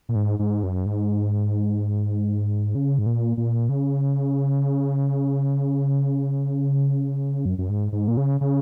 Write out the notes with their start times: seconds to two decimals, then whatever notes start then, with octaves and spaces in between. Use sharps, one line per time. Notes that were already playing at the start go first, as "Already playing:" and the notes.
0.09 A#2
0.15 G#2
0.39 G#2
0.63 F#2
0.86 G#2
2.75 C#3
2.99 G#2
3.06 A#2
3.37 A#2
3.69 C#3
7.45 F#2
7.58 F#2
7.69 G#2
7.93 G#2
8.08 A#2
8.17 C#3
8.41 C#3